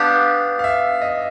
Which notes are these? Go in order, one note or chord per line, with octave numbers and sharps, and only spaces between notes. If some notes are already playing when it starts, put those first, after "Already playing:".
Already playing: B3 D4 G4 F5
F5
E5
D#5